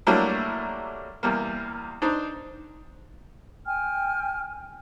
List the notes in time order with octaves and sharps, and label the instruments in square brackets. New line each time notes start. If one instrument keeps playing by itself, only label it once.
[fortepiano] F#3 G3 A3 A#3 D4 E4
E2 G3 A#3
D4 D#4 C5
[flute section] G5 G#5 F6